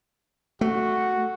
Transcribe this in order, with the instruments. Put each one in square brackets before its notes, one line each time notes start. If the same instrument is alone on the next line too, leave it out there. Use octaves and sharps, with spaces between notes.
[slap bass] A3 [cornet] F#4